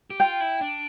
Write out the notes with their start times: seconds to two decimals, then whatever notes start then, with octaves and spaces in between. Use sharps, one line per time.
0.10 G4
0.20 F4 G5
0.40 E4
0.61 D4